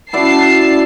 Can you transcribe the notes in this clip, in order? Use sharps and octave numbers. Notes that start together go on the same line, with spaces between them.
C#4 E4 F#4 D5 F#5 A5 C7